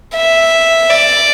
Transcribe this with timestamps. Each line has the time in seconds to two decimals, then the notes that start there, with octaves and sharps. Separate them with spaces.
0.15 E5
0.90 D5